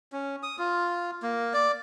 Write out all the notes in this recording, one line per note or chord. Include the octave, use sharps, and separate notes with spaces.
C#4
D#6
F4
A#3
D5